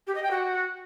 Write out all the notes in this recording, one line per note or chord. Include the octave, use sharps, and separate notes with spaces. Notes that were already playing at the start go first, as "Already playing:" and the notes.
G4
D#5
G5
F#4